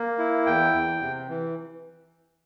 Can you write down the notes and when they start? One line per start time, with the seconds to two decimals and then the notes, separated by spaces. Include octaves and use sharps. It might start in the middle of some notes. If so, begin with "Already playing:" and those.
Already playing: A#3
0.19 E4
0.46 E2 G5
0.74 E2
1.01 C3
1.29 E3